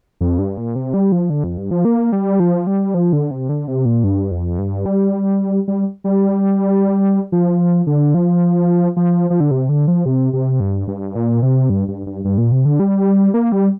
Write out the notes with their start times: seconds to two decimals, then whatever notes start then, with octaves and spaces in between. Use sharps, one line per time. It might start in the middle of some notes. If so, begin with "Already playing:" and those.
0.21 F2
0.39 G2
0.57 A#2
0.76 C3
0.94 G3
1.12 F3
1.30 D3
1.44 F2
1.57 G2
1.71 F3
1.85 A#3
2.12 G3
2.40 F3
2.67 G3
2.94 F3
3.13 D3
3.31 C3
3.49 D3
3.68 C3
3.85 A#2
4.04 G2
4.31 F2
4.59 G2
4.86 G3
5.68 G3
6.04 G3
7.32 F3
7.87 D3
8.14 F3
8.97 F3
9.30 F3
9.40 D3
9.51 C3
9.69 D3
9.88 F3
10.06 C3
10.33 C3
10.60 G2
10.88 G2
11.15 A#2
11.42 C3
11.70 G2
11.88 G2
12.06 G2
12.25 G2
12.38 A#2
12.52 C3
12.65 D3
12.80 G3
13.34 A#3
13.52 G3